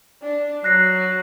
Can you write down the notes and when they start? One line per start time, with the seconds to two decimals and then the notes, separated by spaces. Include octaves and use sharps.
0.22 D4
0.64 F#3 F#6 A#6 C7